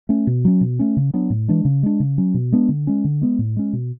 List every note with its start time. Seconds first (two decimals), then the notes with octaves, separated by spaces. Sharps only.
0.09 A3 C#4
0.27 B2
0.45 F#3 C#4
0.61 B2
0.79 A3 C#4
0.97 C#3
1.14 F#3 B3 D4
1.30 A2
1.48 E3 G#3 D4
1.65 C#3
1.83 G#3 D4
2.00 C#3
2.18 F#3 C#4
2.34 B2
2.52 G#3 B3 D4
2.69 D3
2.87 G#3 C#4
3.04 D3
3.21 G#3 B3
3.39 A2
3.56 G#3 C#4
3.73 B2